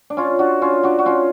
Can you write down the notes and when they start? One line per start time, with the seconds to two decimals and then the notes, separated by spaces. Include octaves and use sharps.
0.10 D4
0.17 C#4 F4
0.39 D4 F#4
0.62 C#4 F4
0.83 D4 F#4
0.99 F#4
1.06 C#4 F4